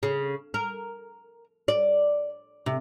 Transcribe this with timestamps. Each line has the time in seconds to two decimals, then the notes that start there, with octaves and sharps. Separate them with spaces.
0.03 C#3
0.54 A#4
1.68 D5
2.66 C3